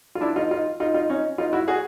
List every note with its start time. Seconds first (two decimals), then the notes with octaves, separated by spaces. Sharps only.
0.15 F4
0.21 D4 E4
0.36 D#4 F4
0.51 D#4 F4
0.80 D#4 F4
0.94 D#4 F4
1.09 C#4 D#4
1.38 D#4 F4
1.53 E4 F#4
1.68 F#4 G#4